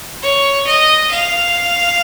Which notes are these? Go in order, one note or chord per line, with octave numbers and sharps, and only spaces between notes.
C#5
D#5
F5